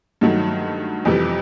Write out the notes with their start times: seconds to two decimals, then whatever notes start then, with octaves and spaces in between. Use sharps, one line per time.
0.21 G2 D#3 F#3 A3
1.05 F2 C3 E3 G3